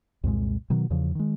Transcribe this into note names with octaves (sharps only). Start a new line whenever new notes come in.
C2 F2 A#2 G#3
B2 D#3 F#3
E2 C#3 F3
D#3 G#3